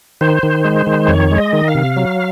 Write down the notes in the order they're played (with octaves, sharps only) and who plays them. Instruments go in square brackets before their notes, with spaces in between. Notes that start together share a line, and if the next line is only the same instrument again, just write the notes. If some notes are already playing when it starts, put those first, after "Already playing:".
[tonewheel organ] D#3 C5
D#3
G#3
D#3
F2 C#5
G#3
D#5
D#3
F5
C3
F#3